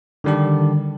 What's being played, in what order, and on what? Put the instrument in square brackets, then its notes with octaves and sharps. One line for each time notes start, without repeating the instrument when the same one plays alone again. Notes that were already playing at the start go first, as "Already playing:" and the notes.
[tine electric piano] D3 D#3 G3 D4 G4